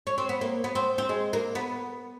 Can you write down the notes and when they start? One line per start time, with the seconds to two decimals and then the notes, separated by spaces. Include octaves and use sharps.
0.07 C#4
0.18 C4
0.29 B3
0.41 A#3
0.64 B3
0.75 C4
0.98 C4
1.09 G#3
1.33 A#3
1.55 B3